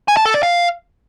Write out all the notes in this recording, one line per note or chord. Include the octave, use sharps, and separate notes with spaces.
G#5
A5
A4
D5
F5